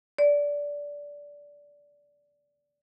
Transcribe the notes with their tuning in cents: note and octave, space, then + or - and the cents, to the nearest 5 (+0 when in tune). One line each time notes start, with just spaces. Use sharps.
D5 -15